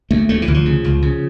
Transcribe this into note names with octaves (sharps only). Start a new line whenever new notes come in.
D2 A3
D2 A3
E3
D2
F3
C#3
C#2
C#3